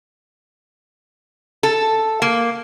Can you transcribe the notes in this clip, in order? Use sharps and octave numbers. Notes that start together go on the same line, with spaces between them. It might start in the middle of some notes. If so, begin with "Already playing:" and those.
A4
A#3